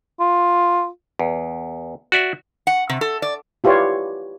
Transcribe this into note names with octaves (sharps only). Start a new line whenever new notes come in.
F4
E2
F#4 D5 E5
F#5
C3
A4
D5
E4 F4 G4 B4 C#5 D5